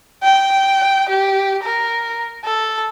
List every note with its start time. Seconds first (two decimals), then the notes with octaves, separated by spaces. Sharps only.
0.24 G5
1.09 G4
1.64 A#4
2.44 A4